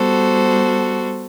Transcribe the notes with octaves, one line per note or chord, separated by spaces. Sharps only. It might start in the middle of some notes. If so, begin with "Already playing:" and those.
Already playing: G3 B3 F#4 A4 C5